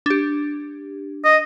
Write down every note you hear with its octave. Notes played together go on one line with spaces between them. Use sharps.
D4 G4
D#5